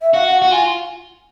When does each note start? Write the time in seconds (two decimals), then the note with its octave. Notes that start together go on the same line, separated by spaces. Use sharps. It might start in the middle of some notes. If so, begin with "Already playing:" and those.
0.02 E5
0.14 F#4 F5
0.27 F#5
0.42 F#4 F#5
0.51 F4 G#5